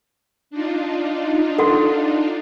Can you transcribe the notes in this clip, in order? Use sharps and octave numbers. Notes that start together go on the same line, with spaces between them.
D4 D#4 F4
A4 F#5 C6